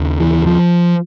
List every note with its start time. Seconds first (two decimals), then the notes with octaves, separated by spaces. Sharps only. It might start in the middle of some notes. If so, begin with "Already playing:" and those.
Already playing: D#2 C#3
0.20 E3
0.46 F3